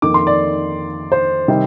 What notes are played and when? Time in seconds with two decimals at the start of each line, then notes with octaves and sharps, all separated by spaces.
0.02 F2 D#3 A#3 D#4 D6
0.14 C6
0.27 D5
1.12 C5
1.48 C3 D#3 G3 C4 D#4